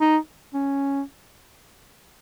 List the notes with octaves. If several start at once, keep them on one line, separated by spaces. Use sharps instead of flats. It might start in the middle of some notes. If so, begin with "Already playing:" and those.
D#4
C#4